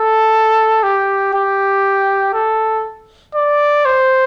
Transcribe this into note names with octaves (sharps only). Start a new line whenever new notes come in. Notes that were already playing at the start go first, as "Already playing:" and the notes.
Already playing: A4
G4
G4
A4
D5
C5